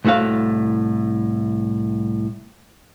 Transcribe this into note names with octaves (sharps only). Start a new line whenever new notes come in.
C2 A2 A3 F#4 F5